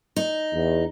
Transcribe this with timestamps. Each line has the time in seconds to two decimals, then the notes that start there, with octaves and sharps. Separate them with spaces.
0.16 D#4
0.53 E2